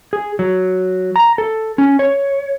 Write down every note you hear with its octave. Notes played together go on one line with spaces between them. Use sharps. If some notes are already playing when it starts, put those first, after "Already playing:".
G#4
F#3
A#5
A4
C#4
C#5